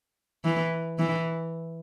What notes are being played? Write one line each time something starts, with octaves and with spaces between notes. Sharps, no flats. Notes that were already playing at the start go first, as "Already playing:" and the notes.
E3
E3